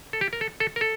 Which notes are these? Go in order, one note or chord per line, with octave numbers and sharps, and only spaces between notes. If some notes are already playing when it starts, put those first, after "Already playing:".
A4
G4
A#4
A4
A4
A#4
A4